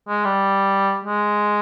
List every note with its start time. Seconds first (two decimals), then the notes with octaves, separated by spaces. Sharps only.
0.09 G#3
0.25 G3
1.04 G#3